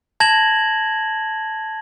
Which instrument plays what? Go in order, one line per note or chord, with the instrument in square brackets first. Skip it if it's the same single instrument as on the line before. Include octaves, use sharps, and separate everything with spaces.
[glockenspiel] A5 G#6 A#6 E7 F#7